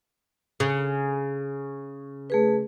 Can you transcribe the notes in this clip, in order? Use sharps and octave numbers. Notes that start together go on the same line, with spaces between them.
C#3
A3 G#4 B4